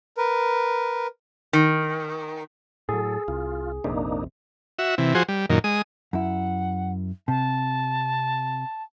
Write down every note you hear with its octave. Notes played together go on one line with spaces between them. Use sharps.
A#4 B4
D#3
A2 F#3 G#4 A4
C2 F4
A#1 F2 C3 A#3 D4 D#4
F#4 E5
C3 E3
F3 F#4 G#4 C5
G3
F#2 A#2 D#3
G#3 D#6
F#2 E4 F#5
C3 A5